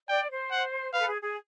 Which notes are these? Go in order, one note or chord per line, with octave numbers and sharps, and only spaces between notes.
D5 G5
C5
F#5
B4 F5
A4
G#4
G#4